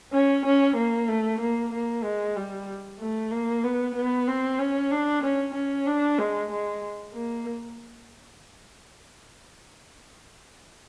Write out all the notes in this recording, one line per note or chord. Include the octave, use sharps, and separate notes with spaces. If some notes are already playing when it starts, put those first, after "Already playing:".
C#4
C#4
A#3
A3
A#3
A#3
G#3
G3
A3
A#3
B3
B3
C4
C#4
D4
C#4
C#4
D4
G#3
G#3
A#3